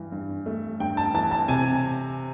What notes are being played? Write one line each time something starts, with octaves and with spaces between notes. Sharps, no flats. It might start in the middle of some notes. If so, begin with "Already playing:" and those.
Already playing: G2 E3
G2
A3
G2 G5
A5
E3 A5
A5
C3 G#5